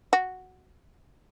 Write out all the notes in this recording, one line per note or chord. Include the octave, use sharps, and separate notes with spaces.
F#4